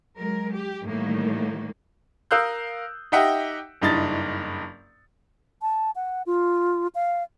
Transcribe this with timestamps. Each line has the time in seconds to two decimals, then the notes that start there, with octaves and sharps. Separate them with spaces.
0.17 F#3 G#3 A#4
0.53 G4
0.83 A2 D#3 E3 G3 A#3
2.31 A#4 F5 D#6 E6 F#6 G6
3.12 D#4 G4 D#5 E5 F#5 G5
3.81 F#1 G2 D#4 E4 A6
5.62 A5
5.96 F#5
6.26 F4
6.95 F5